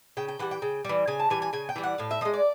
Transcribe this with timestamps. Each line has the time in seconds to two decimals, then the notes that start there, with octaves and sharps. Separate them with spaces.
0.17 C#3 G5
0.28 G5
0.39 E3 G3 F#5
0.51 G5
0.62 C#3
0.85 E3 G3
1.07 C#3 G#5
1.19 A5
1.30 E3 G3 G#5
1.42 G#5
1.53 C#3 G#5
1.69 G5
1.76 E3 G3
1.83 F#5
1.98 A2 F5
2.11 E5
2.21 F3 G#3 D#5
2.33 D5